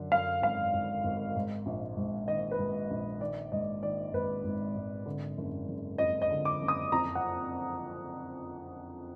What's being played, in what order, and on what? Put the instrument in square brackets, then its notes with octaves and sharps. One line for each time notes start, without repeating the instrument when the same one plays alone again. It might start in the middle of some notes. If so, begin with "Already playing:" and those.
Already playing: [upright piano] F#2 D3
F#2 F5
G#1 F5
G#1
G#1
G#2
A#1
G#2
D#3 D#5
B4
G#2
A#1
D#3 D5
G#2 D#5
D#3 D5
G#1 B4
G#1
G#1
D3
F#1
F#1
F2 D#5
D#5
D3
D6
F#1
D#6
F2 A#5
F#5